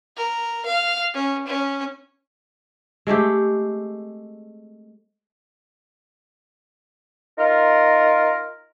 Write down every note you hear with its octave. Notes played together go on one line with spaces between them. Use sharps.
A#4
F5
C#4
C#4
G#3 A3 C4 G4
D#4 F4 A#4